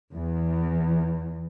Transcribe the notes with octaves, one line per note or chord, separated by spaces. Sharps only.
E2